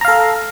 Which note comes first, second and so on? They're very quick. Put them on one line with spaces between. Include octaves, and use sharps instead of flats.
A#5 F5 A4